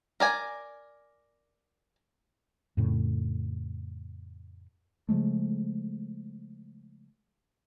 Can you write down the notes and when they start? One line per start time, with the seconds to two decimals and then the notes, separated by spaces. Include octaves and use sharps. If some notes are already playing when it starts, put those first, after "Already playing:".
0.20 A#4 D5 G#5
2.77 F2 A2 C#3
5.09 C#3 F3 G#3 A3